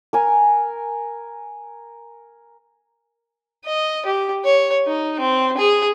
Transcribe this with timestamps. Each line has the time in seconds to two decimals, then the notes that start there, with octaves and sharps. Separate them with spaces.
0.13 A#4 G#5
3.65 D#5
4.05 G4
4.44 C#5
4.87 D#4
5.19 C4
5.57 G#4